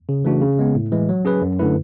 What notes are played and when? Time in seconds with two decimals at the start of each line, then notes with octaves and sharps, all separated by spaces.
0.09 C#3
0.24 E3 A3 D4 F#4
0.42 C#3
0.59 G#3 B3
0.75 A2
0.92 E3 G#3
1.09 F#3
1.25 C#4 G#4 B4
1.42 F#2
1.59 D3 A3 E4 B4